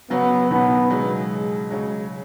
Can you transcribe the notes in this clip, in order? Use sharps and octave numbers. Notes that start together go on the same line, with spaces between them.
C#3 F#3 B3
B2 D#3 B3
C#3 F#3 G#3
C#3 F#3 G#3